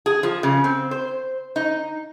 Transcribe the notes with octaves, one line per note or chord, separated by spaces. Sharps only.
G#4
F3
C#3
C4
C5
D#4